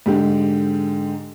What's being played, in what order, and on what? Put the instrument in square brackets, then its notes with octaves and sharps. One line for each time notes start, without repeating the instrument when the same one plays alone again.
[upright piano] G#2 D3 G4